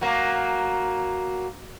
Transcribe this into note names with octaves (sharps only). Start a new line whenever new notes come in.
F#3 A#3